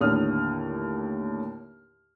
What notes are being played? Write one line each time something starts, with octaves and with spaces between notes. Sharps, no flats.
D#2 A2 D3 C#5 D#6 F6